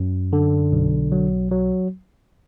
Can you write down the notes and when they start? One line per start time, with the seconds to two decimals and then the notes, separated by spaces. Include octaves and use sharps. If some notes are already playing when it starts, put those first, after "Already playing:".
Already playing: F#2
0.33 D3
0.72 B1
1.12 F#3
1.51 F#3